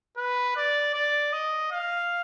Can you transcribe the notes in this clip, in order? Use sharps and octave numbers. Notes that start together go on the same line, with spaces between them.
B4
D5
D5
D#5
F5